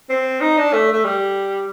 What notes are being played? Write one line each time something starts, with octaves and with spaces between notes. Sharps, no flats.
C4
D#4
D4
A3
A3
G3